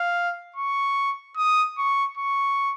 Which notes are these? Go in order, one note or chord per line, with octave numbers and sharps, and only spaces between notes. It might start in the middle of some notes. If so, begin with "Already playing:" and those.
Already playing: F5
C#6
D#6
C#6
C#6